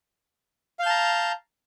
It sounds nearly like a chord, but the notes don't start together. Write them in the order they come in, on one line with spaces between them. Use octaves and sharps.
F5 G6 A5 A#5